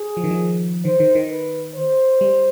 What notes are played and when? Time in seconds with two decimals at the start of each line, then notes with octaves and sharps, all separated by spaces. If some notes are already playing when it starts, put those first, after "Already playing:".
Already playing: G#4
0.17 F3
0.24 D#3
0.31 F3
0.85 D#3 C5
1.00 D#3
1.15 D#3
1.30 B4
1.75 C5
2.21 G3